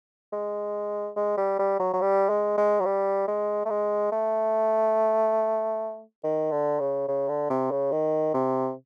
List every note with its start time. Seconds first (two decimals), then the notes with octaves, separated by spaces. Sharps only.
0.33 G#3
1.17 G#3
1.38 G3
1.59 G3
1.80 F#3
1.94 F#3
2.01 G3
2.30 G#3
2.58 G#3
2.81 F#3
2.85 G3
3.28 G#3
3.66 A3
3.70 G#3
4.12 A3
6.24 D#3
6.52 D3
6.80 C#3
7.08 C#3
7.29 D3
7.50 C3
7.71 C#3
7.92 D#3
8.34 C3